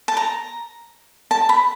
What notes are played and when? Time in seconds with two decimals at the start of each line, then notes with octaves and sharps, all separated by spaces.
0.08 A5
0.17 A#5
1.31 A5
1.49 B5